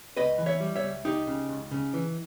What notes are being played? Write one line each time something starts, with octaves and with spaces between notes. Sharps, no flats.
C#2 B4 D#5
E3
C#5 E5
G3
C#5 E5
C#2
C#2 D#4 G4
C#3
C#2
C#3
E3